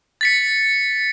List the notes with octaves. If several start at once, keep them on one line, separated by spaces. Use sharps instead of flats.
A6 B6 C#7